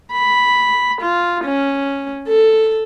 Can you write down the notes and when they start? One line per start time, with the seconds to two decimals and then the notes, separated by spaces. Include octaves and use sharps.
0.12 B5
1.02 F4
1.44 C#4
2.28 A4